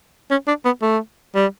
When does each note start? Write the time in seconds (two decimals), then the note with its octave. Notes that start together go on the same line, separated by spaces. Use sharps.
0.31 C#4
0.48 D4
0.65 B3
0.82 A3
1.35 G3